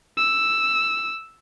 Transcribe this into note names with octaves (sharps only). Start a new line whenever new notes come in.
E6